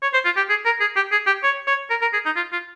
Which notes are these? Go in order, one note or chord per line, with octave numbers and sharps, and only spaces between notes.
C#5
C5
F4
G4
G#4
A#4
G#4
G4
G#4
G4
C#5
C#5
A#4
A#4
G#4
D#4
F4
F4